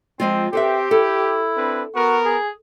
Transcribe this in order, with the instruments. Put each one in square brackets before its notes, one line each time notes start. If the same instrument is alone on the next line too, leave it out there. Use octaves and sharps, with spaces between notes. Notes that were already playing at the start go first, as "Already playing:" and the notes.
[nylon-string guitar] F3 G#3 F4 [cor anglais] C4
[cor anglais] C4 [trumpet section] G4 [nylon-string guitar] A4 B4 E5
[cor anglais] E4 [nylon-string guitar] A4
[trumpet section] C4 D4 B4
[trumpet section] B3 A#4 [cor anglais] F#4
[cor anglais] G#4